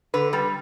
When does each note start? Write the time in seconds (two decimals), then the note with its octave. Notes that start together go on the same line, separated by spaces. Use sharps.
0.14 D3 B4
0.33 G3 A4